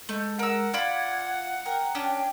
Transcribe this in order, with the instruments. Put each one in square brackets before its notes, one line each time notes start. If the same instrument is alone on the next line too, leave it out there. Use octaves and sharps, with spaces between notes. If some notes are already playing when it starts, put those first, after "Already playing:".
[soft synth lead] G#3 [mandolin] A3 G6
[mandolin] A#4 E6 [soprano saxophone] F#5
[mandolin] F4 D5 B5 [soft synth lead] G#6
[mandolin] A#4 [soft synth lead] G5
[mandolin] C#4 D4 G4